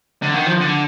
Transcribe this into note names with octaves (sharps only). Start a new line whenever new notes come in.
D3
D#3
F3
D3